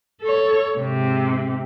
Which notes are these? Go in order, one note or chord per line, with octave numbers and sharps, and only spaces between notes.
A4 C#5
G#2 C3